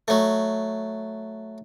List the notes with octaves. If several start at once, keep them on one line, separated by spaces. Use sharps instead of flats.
F#3 A3